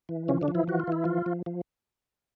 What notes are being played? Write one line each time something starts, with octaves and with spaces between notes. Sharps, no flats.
E3
C#3 F3 C#4
D3 D4
F3
E3 E4
E3 F#4
F4
E3 E4
F3 F4
F3
F3